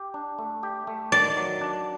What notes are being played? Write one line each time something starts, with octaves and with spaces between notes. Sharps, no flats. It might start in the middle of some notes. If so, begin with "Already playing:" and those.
Already playing: G4
D4
A3
G4
A3
D#3 D5
F#3
D4